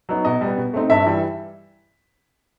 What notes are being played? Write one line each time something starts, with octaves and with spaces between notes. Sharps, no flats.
F#3 B3 D#4
B2 D#5
G3
B3
B2
A3 C4 D#4
G2 E5
E3 G3